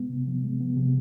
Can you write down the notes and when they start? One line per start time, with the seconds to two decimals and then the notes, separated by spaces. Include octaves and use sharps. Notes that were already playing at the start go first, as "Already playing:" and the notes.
Already playing: G#3 B3
0.10 C3
0.27 F3
0.43 G#3
0.60 B3
0.77 C3